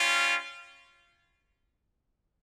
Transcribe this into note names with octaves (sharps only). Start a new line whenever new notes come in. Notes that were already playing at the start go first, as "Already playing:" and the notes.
Already playing: G3 C#4 F4